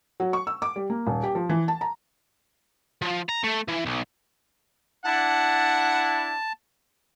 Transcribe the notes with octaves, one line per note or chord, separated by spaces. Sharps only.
F#3
C#6
E6
D6
G3
A#3
D#1
G4
F3
E3
A5
A#5
F3
A#5
A3
E3
B1
D4 E4 F#5 A5